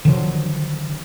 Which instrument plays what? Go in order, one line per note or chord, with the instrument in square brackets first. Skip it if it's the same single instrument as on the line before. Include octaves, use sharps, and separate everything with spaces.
[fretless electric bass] D3 D#3 F3 F#3